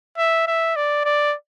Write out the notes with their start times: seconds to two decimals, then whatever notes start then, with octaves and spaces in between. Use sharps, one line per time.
0.18 E5
0.47 E5
0.76 D5
1.05 D5